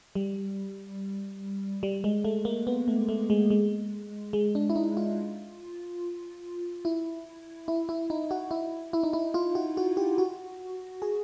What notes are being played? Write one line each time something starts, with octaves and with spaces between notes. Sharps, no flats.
G3
G3
G#3
A3
A#3
B3
A3
A3
G#3
G#3
G#3
D4
E4
D#4
F4
E4
E4
E4
D#4
F#4
E4
E4
D#4
E4
F4
F#4
F#4
G4
F#4
G#4